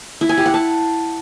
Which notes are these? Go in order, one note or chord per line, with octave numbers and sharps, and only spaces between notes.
E4
G#5
G4
F#5
A5